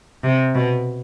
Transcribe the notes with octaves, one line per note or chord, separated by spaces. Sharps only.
C3
B2